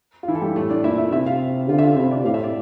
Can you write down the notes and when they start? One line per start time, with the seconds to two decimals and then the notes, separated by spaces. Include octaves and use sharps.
0.23 F4
0.28 E3 E4
0.35 A4
0.41 G3 G4
0.56 A2 A3 A4
0.70 D4 D5
0.84 A#2 E4 E5
0.98 E4 E5
1.12 C3 E4 E5
1.26 F4 F5
1.69 D3 F4 F5
1.79 E5
1.83 F4 F5
1.96 C3 E4 E5
2.11 D4 D5
2.25 A2 F5
2.34 E5
2.43 D5